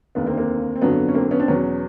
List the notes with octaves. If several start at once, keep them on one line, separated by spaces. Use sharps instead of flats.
F1 D#2 D3 B3
A#3 C4
A#3 C4
C4
G1 F2 D3 F#3 B3
C#4
A#3 C4
B3 C#4
C4 D4
E2 B2 F#3 B3 C#4